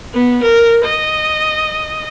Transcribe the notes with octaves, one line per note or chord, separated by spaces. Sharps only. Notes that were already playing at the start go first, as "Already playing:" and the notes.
B3
A#4
D#5